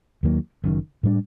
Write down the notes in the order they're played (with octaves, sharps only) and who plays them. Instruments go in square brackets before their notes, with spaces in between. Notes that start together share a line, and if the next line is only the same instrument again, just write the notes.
[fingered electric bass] D#2 D#3 F#3 A#3
F#1 F#2 D#3
A2 G3 D4